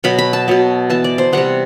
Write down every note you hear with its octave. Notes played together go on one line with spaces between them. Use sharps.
B2 F#3 B3 B5
B5
A5
B2 F#3 B3
E3 B3 A5
D5
C5
C3 G3 B3 F#5